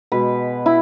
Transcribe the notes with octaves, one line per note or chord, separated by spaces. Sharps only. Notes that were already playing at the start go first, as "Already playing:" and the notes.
B2 G#3 B4
E4